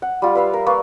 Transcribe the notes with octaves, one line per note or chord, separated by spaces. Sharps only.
F#5
G3 F4
B4 E5 F5
A#4
A#3 B4 D5 C#6